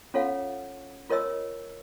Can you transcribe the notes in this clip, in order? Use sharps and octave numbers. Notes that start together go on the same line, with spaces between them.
C#4 F4 A4 C#5 F5 F#5
F4 A#4 C#5 D#5 E6